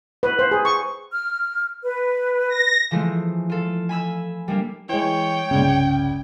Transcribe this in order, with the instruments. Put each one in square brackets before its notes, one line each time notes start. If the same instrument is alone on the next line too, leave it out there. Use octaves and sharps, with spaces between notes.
[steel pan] B4
C5
G#4
C#6
[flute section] F6
B4
[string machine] A#6
[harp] E3 F3 G#3 A3
F4 A4
G#5 B5 E6 G#6
G3 A#3 D4
[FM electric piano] E3 G#3 [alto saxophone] C#5 [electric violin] G5
[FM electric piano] G1 C2 G#6 [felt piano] C#3 G#3 D5